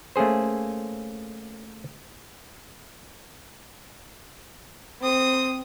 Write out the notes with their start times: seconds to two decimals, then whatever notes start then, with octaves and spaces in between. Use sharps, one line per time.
0.16 A3 A#3 C#4 G#4 C5
5.01 C4 D#6